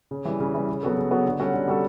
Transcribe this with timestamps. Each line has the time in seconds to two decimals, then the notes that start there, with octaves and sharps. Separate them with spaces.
0.11 C#3
0.25 E3 G3
0.40 C#3
0.54 E3 G3
0.69 C#3
0.83 F#3 B3 F#4 A4
0.97 C#3
1.11 F#3 B3 F#4 A4
1.26 D3
1.39 G3 C#4 F#4 A4
1.54 D3
1.68 G3 C#4 F#4 A4